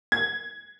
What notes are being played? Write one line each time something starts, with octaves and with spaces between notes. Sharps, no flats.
G#6